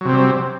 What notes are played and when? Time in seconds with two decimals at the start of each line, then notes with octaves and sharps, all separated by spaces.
0.01 F#3
0.05 C3
0.09 C4
0.13 G3